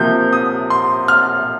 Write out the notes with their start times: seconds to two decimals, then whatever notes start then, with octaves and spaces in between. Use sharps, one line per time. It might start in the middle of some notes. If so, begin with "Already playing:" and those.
Already playing: C3 F3 A#3 G6
0.33 D#6
0.70 C6
1.08 F6